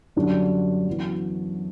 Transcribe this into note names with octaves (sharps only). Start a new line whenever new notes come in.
F#2 D3 G3 D4 F#4
F#2 E3 B3 F#4